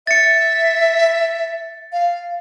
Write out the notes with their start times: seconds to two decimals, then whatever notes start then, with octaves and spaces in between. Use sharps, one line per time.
0.07 E5 A6 C#7
1.92 F5